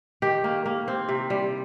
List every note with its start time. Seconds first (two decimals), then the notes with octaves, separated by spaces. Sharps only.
0.22 D#3 G4
0.44 A#3
0.65 A#3
0.88 C4
1.09 C3
1.30 G3